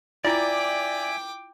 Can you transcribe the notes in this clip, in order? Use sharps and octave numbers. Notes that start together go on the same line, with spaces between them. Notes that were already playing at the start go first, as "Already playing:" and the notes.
E4 F4 D5 E5 G5 G#5 D6